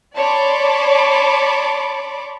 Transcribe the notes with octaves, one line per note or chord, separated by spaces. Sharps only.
C#5 D5 A5 B5 C6 D6